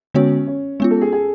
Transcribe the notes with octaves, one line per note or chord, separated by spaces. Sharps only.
D3 G#3 B3 C#4 F#4 C#5
C#4
G#3 B3 C#4 F4
A4
G#4
G#4